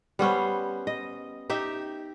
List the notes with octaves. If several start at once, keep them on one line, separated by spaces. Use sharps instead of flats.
G3 B3 C#4 C5
D#5
D#4 G4 E5